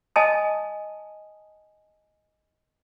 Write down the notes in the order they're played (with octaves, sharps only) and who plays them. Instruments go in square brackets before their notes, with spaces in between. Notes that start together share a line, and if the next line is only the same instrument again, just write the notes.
[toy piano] D#5 G#5 A5 D#6